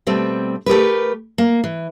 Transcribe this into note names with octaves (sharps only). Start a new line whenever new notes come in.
B2 G3 A3 C4
A3 G4 A#4 B4
A#3
E3